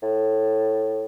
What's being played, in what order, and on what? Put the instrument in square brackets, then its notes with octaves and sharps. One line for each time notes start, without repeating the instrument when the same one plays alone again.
[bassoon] A2